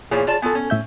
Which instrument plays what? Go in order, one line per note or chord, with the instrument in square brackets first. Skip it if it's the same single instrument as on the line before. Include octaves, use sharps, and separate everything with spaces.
[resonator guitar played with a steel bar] A#2 E3 F3 [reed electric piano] G#4 C#5
[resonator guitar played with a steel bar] F4 D5 A5
[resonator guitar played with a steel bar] B3 F4 F#4 [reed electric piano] A4 G#5
[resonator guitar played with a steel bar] C#4
[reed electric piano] A2 E5 G6